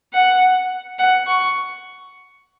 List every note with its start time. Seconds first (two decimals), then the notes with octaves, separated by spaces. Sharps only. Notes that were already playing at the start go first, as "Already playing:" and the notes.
0.13 F#5
0.99 F#5
1.26 C#6